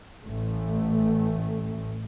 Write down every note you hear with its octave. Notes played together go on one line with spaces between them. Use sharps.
A1 A3